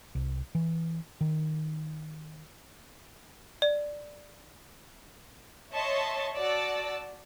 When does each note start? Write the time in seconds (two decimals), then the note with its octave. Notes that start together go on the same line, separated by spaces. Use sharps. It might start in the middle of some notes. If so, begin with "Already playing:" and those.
0.15 C2
0.55 E3
1.21 D#3
3.62 D5
5.72 C#5 D#5 E5 A5 C6 C#6
6.36 F#4 D5 A5 E6